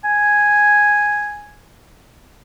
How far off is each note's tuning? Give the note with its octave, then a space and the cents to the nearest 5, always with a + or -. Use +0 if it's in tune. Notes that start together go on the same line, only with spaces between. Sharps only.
G#5 +0